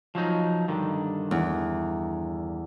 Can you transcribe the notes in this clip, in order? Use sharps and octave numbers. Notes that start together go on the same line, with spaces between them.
F3 F#3 D#4
G2 D3 D#3
E2